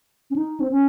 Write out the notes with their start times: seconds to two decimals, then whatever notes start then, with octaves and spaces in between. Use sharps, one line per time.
0.31 C#4
0.36 D#4
0.60 C4
0.71 C#4